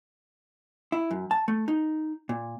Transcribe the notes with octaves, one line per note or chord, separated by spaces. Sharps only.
E4
F#2
A5
A3
D#4
A#2